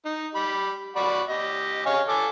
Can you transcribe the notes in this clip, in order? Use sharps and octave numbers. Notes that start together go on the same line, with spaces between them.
D#4
G4 B5
F#4 D5 B5
G4 D#5
C#5 F5 G#5
A4 G#5 D6